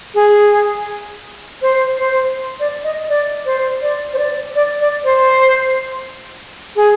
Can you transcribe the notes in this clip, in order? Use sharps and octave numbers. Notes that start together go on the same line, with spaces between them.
G#4
C5
C5
D5
D#5
D5
C5
D5
C5
D5
D5
D5
C5
G#4